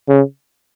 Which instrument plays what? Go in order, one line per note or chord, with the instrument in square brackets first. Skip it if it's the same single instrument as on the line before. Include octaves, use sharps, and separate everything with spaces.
[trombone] C#3